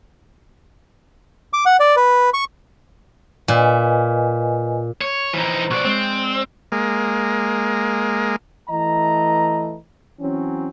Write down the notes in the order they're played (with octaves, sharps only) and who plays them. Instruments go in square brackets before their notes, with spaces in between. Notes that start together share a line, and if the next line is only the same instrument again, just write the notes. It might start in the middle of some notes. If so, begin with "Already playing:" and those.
[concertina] D6
F#5
D5
B4
C#6
[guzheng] A#2 [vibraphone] B4 D#5 G#5
[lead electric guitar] C#5
[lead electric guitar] E3 D#4 [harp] F3
[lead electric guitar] B1 D5 [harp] C#6 F#6
[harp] G#3 D5 [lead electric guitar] C4
[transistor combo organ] G#3 A#3
[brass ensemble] E3 A3 B4 D#5 A#5
E3 F#3 C4 C#4